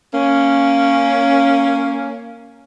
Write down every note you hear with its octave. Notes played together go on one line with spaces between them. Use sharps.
A#3 C#4